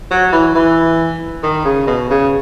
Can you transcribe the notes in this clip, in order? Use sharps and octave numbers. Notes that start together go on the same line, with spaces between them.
F#3
E3
E3
D#3
C#3
B2
C#3